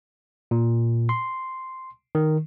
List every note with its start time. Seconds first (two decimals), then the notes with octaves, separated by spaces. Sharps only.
0.51 A#2
1.09 C6
2.15 D#3